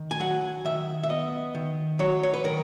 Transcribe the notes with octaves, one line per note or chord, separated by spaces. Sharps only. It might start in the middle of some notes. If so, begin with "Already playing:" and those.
Already playing: D#3
G#5
F#3 F#5
D#3 E5
E5
B3 D#5
D#3
F#3 C#5
C#5
B4
D#3 A#4